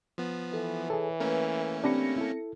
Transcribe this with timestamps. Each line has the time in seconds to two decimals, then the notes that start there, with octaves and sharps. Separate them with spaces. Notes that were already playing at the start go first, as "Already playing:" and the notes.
0.18 F3 B3
0.54 E3 A4
0.90 G#4 A4 C#5
1.20 A3 A#3 C#4 A#4 B4
1.84 C4 D4 G4 B5 A#6 C#7
2.18 E4 A4